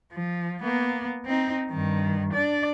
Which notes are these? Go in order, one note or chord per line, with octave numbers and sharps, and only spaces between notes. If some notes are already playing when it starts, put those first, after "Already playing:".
F3
A#3 B3
C4 D#4
G2 D#3
D4 D5